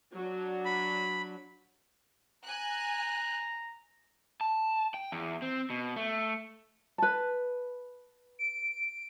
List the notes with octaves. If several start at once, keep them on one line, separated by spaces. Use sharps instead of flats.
F#3 D4
B5
G#5 A#5 F#6
A5
G5
E2
C4
B2
A3
B4 A5
D7